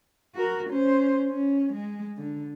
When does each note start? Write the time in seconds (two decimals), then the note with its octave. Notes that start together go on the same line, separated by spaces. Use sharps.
0.35 F#4 A#4
0.70 C#4 C5
1.29 C#4
1.73 G#3
2.18 D3